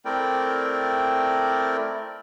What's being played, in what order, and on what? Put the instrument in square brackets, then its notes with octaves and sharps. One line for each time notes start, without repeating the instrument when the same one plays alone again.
[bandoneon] A3 C4 E4 A#4 D5 G5